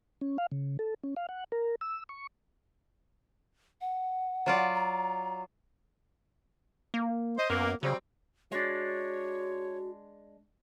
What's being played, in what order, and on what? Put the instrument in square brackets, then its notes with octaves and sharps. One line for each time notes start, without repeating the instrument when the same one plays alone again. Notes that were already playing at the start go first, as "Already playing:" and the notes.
[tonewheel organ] C#4
F5
C#3
A4
C#4
F5
F#5
A#4
E6
C#6
[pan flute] F#5
[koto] F#3 F4 D5
[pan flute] A#5
[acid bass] A#3
[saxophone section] C5 D#5
[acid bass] F#2 [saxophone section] A#3 B3
[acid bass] C#3 [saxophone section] F#3 G3 C4
[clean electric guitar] G#3 D4 [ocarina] F#4 [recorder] C#5